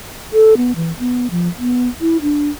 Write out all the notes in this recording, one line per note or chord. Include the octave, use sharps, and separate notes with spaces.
A4
B3
E3
B3
F3
B3
E4
D4